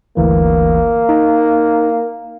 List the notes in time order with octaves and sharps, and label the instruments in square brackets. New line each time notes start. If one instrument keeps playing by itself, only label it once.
[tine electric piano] G1 D2 E3 [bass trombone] A#3
[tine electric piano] D#4